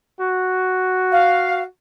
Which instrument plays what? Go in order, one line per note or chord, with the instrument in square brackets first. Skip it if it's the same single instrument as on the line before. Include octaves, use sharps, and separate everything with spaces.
[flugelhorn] F#4
[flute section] F5